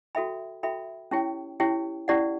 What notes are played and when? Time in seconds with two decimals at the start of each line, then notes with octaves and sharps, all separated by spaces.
0.15 F#4 A4 E5 G5 B5
0.63 F#4 A4 E5 G5 B5
1.11 C#4 E4 G4 C#5 G5
1.60 C#4 E4 G4 C#5 G5
2.08 C#4 E4 G4 D5 F#5